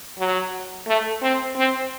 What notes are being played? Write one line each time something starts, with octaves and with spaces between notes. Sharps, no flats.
F#3
A3
C4
C4